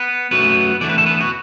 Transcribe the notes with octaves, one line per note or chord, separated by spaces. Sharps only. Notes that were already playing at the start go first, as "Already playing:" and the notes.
Already playing: B3 B4
F#2 F#3 A3 B3 B4
E2 D3 A3 D5
B4
A4
B3 B4
F#4